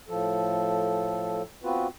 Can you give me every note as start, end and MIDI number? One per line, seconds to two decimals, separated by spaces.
0.09 1.42 45
0.09 1.42 53
0.09 1.42 69
1.64 1.87 59
1.64 1.87 60
1.64 1.87 65
1.64 1.87 66
1.64 1.87 71